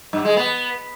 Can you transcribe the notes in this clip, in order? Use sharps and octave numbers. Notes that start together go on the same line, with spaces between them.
G2
G#3
B3